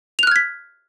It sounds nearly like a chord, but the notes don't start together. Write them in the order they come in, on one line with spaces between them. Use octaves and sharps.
F7 F#6 F6 G#6 B6